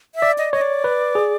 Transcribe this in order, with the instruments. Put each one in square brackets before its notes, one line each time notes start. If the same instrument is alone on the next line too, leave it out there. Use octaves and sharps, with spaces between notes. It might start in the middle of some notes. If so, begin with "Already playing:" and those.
[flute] E5
[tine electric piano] D5
[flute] D#5
[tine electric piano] C#5 [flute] D#5
[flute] D5
[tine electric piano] B4
G#4